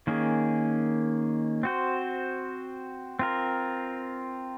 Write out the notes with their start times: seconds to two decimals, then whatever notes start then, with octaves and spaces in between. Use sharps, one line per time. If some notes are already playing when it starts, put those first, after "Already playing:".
0.07 D#3 A#3 C#4 G#4
1.63 C4 F#4 C5
3.19 C4 F4 A#4